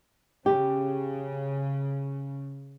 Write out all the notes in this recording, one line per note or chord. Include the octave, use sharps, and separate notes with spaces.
C#3 G4